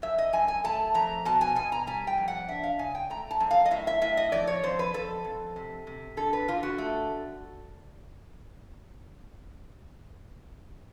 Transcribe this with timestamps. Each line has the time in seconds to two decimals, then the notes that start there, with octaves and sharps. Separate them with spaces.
0.02 F#2 E5
0.18 D#5
0.33 F#2 G#5
0.48 G#5
0.64 A3 A5
0.94 F2 A#5
1.25 B2 A5
1.41 G#5
1.56 B2 G#5
1.72 A#5
1.87 G3 G#5
2.07 G5
2.18 F2
2.28 F#5
2.49 D4 E5
2.63 F5
2.79 C#3 G#5
2.95 G5
3.10 A3 A#5
3.31 A5
3.40 F#2
3.51 F5
3.65 D#5
3.71 A2 E5
3.87 E5
4.02 A2 E5
4.17 D#5
4.32 F2 D5
4.47 C#5
4.63 F2 C5
4.79 B4
4.94 F2 A4
5.24 F2
5.56 C3
5.87 C3
6.17 D3 A4
6.33 B4
6.48 D3 F4
6.63 F#4
6.78 A3